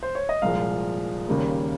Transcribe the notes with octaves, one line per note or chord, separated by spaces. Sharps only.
C5
C#5
D#5
C2 A#2 F3 G#3 F5
D#2 C#3 G3 A#3